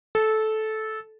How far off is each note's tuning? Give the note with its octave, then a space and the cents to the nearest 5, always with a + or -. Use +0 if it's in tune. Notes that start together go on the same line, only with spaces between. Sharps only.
A4 -15